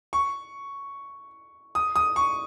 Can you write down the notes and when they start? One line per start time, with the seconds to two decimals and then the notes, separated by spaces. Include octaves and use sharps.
0.13 C#6
1.75 D#6
1.96 D#6
2.16 C#6